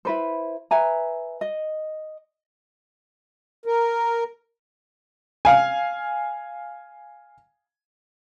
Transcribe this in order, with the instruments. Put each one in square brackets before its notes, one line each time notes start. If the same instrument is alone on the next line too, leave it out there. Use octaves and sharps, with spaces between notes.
[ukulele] E4 B4 C5
B4 E5 G#5 A#5
D#5
[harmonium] A#4
[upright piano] F5 G#5